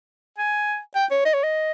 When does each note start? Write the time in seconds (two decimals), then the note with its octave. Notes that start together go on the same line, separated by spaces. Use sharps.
0.38 G#5
0.96 G5
1.11 C#5
1.25 D#5
1.34 C#5
1.44 D#5